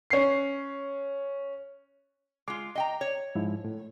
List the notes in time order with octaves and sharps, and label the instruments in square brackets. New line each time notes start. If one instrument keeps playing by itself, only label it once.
[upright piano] C#4 C7
[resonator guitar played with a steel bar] G#3 F4 [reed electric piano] D6
[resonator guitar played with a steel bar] D#5 G5 A#5
C#5
[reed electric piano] G#2 F3 E4
A2